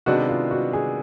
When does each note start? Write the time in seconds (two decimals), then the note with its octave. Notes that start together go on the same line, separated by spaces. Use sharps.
0.06 C3 D#3 G#3 B3 D4 F#4
0.29 F4
0.51 F#4
0.73 G#4